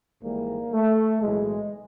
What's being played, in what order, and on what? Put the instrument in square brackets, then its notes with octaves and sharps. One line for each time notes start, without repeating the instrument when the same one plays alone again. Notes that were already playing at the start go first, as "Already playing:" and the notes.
[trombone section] G#1 G#2 E3 G3 A#3
A3
B1 A2 E3 G#3